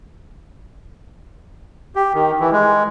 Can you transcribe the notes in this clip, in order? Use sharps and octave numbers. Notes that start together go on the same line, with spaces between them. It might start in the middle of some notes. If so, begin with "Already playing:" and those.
G4
D#3
E3
G#3